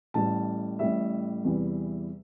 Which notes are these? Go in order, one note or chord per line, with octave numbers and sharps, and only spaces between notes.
A1 A2 G3 A5
A1 A2 G3 E5
E2 C3 E3 G3